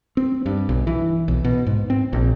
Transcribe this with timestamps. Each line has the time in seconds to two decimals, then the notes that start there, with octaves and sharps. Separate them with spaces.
0.17 C4
0.46 G2
0.69 B1
0.87 E3
1.28 B1
1.44 B2
1.67 G#2
1.90 C4
2.13 A#1